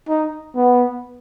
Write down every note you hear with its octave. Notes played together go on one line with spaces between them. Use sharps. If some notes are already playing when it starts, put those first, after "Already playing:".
D#4
B3